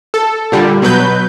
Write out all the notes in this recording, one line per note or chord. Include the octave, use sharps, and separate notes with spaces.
A4
A#2 D3 G3
B2 F#3 B4 G6